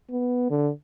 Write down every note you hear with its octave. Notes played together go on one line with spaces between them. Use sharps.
B3
D3